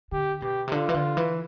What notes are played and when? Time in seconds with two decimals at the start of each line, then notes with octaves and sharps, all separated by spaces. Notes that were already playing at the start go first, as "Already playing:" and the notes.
0.12 D3 G4
0.42 B2 G4
0.68 C3
0.72 D3 F4
0.89 E3
0.94 D3
1.17 E3